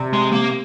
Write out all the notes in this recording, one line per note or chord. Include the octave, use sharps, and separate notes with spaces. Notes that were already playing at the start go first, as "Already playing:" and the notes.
Already playing: C3
G#3
A#3